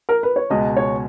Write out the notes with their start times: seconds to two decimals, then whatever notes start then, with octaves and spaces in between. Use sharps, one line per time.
0.09 A#4
0.23 B4
0.36 C#5
0.50 C#2 B2 G#3 D#5
0.77 C#5